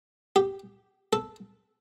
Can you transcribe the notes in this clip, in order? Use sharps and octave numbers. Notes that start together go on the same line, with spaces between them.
G4
A4